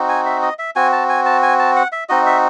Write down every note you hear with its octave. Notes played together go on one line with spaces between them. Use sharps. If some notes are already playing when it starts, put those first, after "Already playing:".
Already playing: C4 D#4 F#4
G#5
E5
D#5
E5
C4 F#4 G#5
A5
G#5
A5
G#5
A5
F#5
E5
C4 D#4 F#4 D#5
E5